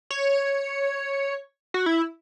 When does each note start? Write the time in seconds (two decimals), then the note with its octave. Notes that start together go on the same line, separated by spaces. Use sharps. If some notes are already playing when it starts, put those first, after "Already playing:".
0.10 C#5
1.74 F#4
1.86 E4